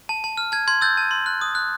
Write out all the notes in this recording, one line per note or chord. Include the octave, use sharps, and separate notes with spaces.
A5
A5
F6
A5 G#6
C6 G#6
E6 G6 A6
A5
C6
F#6
D#6
F#6